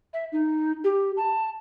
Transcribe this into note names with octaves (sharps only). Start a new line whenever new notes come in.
E5
D#4
G4
A5